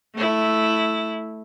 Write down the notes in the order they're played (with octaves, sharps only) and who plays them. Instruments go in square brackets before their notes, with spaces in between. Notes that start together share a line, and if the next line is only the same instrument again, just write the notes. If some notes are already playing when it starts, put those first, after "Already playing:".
[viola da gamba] A3 E4